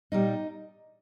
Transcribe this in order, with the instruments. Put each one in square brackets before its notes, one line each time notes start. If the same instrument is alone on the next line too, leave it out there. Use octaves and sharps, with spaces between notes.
[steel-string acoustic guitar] A#2 G3 D#4